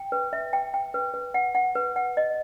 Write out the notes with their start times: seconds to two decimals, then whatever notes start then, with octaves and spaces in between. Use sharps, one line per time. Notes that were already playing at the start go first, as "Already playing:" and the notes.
Already playing: G5
0.12 B4
0.33 E5
0.53 G5
0.74 G5
0.94 B4
1.14 B4
1.34 F#5
1.55 F#5
1.75 B4
1.96 F#5
2.17 D#5